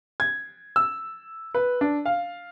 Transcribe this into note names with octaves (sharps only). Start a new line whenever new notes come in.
G#6
E6
B4
D4
F5